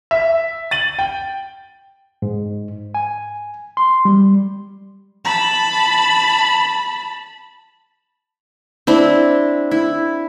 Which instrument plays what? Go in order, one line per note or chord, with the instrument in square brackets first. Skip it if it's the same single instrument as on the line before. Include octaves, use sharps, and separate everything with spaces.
[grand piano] E5
A6 D#7 F#7
G5
[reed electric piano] G#2
G#5
C6
G3
[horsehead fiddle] A5 B5
[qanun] C4 D4 E4
E4